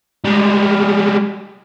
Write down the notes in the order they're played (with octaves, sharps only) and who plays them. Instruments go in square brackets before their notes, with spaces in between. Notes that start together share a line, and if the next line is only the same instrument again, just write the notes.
[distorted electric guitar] G3 G#3